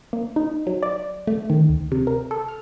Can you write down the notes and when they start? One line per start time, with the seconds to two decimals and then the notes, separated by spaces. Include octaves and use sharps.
0.13 A#3
0.36 D#4
0.67 F#3
0.83 D5
1.27 A3
1.50 D#3
1.69 D2
1.92 C3
2.07 A#4
2.31 A4
2.48 F6